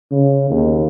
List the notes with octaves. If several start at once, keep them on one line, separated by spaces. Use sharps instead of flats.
C#3
D#2